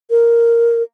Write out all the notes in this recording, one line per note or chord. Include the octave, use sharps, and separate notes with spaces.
A#4